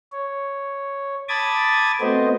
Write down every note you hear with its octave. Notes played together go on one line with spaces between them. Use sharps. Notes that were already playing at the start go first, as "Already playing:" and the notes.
C#5
A5 B5 D6 D#6 G#6 A6
A3 B3 C4 F#4 C5 D#5